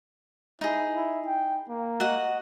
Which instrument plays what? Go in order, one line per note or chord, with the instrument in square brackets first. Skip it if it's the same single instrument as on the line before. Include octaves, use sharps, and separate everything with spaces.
[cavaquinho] D#4 G#4 [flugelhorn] E4
[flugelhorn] E4
G5
A#3
[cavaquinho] F#4 D#5 F#5